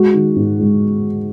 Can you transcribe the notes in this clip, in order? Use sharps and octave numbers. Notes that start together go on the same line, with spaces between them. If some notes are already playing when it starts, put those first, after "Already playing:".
Already playing: G#3 F#4
D#3
G#2
G#3